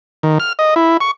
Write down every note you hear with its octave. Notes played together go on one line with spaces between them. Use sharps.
D#3
F6
D#5
E4
C#6